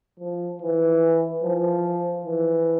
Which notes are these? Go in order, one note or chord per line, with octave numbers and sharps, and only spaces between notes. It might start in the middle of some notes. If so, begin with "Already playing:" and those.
F3
E3
F3
E3